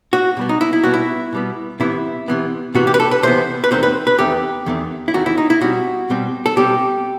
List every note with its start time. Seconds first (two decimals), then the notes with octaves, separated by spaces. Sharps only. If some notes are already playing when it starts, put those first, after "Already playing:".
0.13 F#4
0.37 B2 G3 B3
0.49 D#4
0.61 E4
0.73 E4
0.84 B2 G3 B3 F#4
0.94 E4
1.33 B2 G3 B3
1.80 C3 E3 B3 E4
2.28 C3 E3 B3
2.75 C3 E3 B3 F#4
2.87 G4
2.94 B4
3.00 A4
3.11 B4
3.23 C3 E3 B3 C5
3.64 B4
3.71 E2 D#3 A3 C4 C5
3.83 B4
4.07 B4
4.18 E2 D#3 A3 C4 G4
4.66 E2 D#3 A3 C4
5.08 E4
5.14 E2 D#3 A3 C4 F#4
5.26 E4
5.38 D#4
5.50 E4
5.61 B2 G3 C4 F#4
6.10 B2 G3 C4
6.46 A4
6.57 B2 G3 C4 G4